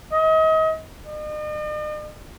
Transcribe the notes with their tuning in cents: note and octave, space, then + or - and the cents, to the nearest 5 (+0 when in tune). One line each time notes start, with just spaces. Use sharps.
D#5 +35
D#5 -45